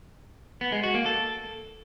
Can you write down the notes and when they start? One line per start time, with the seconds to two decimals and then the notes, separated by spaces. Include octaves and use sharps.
0.61 B3
0.72 G#3
0.83 F#4
0.95 A#3
1.06 A4